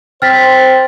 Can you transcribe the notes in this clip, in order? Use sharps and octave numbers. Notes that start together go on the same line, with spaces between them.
C4 C5 F6 A6 B6